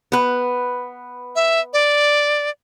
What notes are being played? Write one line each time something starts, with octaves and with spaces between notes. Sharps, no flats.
B3 B4
E5
D5